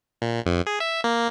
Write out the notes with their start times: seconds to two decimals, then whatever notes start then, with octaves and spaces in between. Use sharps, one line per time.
0.22 A#2
0.46 F2
0.67 G#4
0.80 E5
1.04 A#3